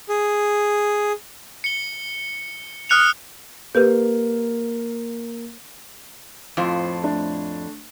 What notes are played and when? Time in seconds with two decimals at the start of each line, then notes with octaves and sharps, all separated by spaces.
0.09 G#4
1.64 C#7 G7
2.89 D#6 F6 F#6 C#7 F7
3.75 A#3 G4 B4 G6
6.57 F2 A2 F4 C5
7.04 A3 D4